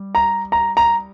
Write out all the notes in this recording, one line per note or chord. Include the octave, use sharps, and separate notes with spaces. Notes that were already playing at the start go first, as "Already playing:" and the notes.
Already playing: G3
A#5
A#5
A#5